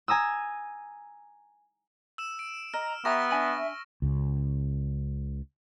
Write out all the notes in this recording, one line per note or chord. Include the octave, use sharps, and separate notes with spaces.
G#5 A#5 D#6 E6
E6 E7
D7
D#5 A#5 F6
B3 G4 E5 A#5 C#6 A#6
D4 G#5 B5
C#2 C#3